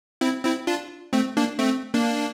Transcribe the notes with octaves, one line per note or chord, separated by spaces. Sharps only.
C4 E4
C4 E4
D4 F4
A3 C4
A#3 D4
A3 C4
A#3 D4